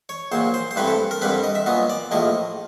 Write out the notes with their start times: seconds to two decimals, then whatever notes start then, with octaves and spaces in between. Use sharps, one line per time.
0.09 C#5
0.32 A#1 A#2 F#3 C5
0.54 C5
0.71 C5
0.76 G2 E3 A3 C4 B4
0.87 A4
1.11 A#4
1.21 G2 D3 G3 C4 B4
1.43 D#5
1.55 E5
1.66 A#2 F#3 B3 D#5
1.90 D5
2.11 A#1 A2 F3 A3 D#5